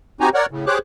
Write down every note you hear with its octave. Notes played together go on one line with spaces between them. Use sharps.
C4 D#4 F#4 G4 G#5 A#5
A#4 C#5 D5 F#5
A2 C#3
G4 G#4 C5 C#5 D6 F#6